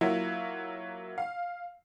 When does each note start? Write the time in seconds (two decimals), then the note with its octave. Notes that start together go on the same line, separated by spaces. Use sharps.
0.01 F#3 A#3 E4 F4
1.18 F5